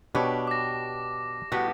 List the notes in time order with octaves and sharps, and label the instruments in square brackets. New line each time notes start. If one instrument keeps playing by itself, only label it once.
[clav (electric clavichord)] B2 B4 C#5 [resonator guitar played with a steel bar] D4 G4
[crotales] D6 A#6
[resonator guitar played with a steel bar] A2 G3 B3 [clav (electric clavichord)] F#4